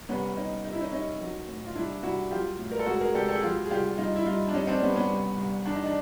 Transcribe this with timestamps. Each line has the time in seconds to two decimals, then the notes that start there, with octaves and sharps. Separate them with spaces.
0.09 C2 B3 C#4
0.36 C2 C#4 D#4
0.64 D#2 D#4
0.73 E4
0.81 C#4 D#4
0.92 D#2 C#4 D#4
1.20 F#3
1.48 A2
1.66 F4
1.76 C2 D4 E4
2.03 C2 E4 F#4
2.31 F#3 F4 G4
2.59 A2
2.71 A#4
2.79 A4
2.86 C#2 F#4 G#4
3.00 G#4 A#4
3.15 C#2 G4 A4
3.29 G4 A4
3.35 G#4
3.43 F#3 F4 G4
3.66 G#4
3.70 C2 F4 G4
3.98 G2 D#4 F4
4.16 E4
4.26 G2 D#4 F4
4.48 D4
4.54 G2 C#4 D#4
4.67 C4 D4
4.81 G2 B3 C#4
4.96 B3 C#4
5.10 C2
5.37 C2
5.65 E2 D4
5.75 D#4
5.86 D4